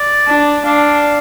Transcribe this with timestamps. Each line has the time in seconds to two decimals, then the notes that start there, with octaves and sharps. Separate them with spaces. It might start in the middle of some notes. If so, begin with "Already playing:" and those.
Already playing: D5
0.27 D4
0.65 D4 F5